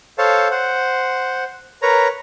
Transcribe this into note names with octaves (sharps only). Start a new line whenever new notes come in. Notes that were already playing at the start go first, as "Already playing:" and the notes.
A4 C5 C#5 F5 A5
C5 F#5
A#4 B4 C#5 A#5